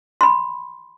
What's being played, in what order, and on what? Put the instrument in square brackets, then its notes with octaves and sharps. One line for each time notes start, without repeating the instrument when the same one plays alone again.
[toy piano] B5 C6